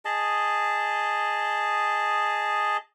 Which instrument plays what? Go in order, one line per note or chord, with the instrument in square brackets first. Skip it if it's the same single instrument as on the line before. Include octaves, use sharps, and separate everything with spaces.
[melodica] G#4 D#5 A5